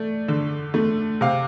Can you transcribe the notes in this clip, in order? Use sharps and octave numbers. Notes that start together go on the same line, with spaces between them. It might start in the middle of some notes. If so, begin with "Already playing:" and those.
Already playing: A3 D5
D3
A3
C3 F5